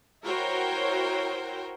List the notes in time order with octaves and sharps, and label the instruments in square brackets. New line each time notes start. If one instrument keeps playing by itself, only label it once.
[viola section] E4 F#4 A#4 C5 C#5 G5